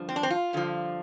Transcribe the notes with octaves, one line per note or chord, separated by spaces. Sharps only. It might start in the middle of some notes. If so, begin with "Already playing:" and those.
Already playing: G2 D3 F3
C4
D4
C4
F4
G2 D3 F3